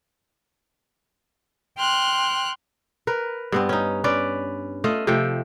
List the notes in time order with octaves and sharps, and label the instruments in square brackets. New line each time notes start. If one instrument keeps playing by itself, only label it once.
[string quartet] G5 C6 F6 F#6
[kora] A#4 B4
G2 B3 C4
C#4 D#4
C#4 B4 D5
A3 F4 D#5
C3 F3 A3 G5